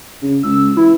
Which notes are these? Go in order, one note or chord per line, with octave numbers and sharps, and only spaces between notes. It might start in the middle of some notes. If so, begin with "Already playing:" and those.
C#3
C#2 E6
E3 E4